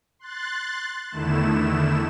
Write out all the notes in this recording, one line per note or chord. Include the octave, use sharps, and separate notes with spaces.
C6 F#6 A6
E2 D3 D#3 A3 E4 E7